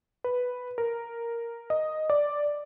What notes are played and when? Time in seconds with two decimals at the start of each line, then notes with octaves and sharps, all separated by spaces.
0.24 B4
0.78 A#4
1.70 D#5
2.10 D5